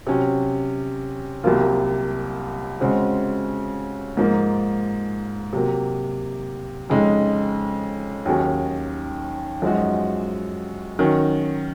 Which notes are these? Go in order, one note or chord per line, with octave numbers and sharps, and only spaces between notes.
C3 F#3 C#4
C2 C3 F#3 A#3 F4
C#3 G#3 C4 F#4
G#2 F3 A#3
C3 F#3 A#3
F2 C#3 G#3 D#4
D#2 D#3 F#3 C#4 G#4
F#2 F3 G#3 D#4 F#4
D#3 F#3 C#4